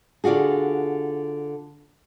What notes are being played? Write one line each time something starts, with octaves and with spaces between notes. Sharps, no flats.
D3 D4 F4 F#4 G#4